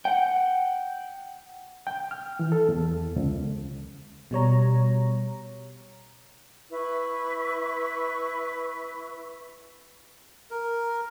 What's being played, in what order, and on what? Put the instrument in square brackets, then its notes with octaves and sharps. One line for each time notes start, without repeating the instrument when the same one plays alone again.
[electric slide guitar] F#5 G5
[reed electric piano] G5
F6
E3
A4
E2
C#2
[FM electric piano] B2 G3 C#5 A#5
[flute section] E4 B4 C#6
[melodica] A#4